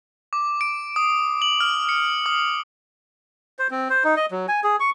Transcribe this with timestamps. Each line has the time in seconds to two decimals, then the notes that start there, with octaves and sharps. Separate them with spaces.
0.33 D6
0.61 D7
0.96 D#6
1.42 F#7
1.60 F6
1.89 C#7
2.26 D#6
3.59 C5
3.71 C4
3.90 C5
4.04 D#4
4.17 D#5
4.31 F#3
4.48 G#5
4.64 G#4
4.80 C#6